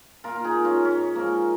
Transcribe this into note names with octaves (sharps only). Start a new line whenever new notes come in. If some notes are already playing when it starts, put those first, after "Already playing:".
A#2 F4 A#4
D#4 G#4
G#3
C#4 F4
G#2 C#4
F3 G#3 A#3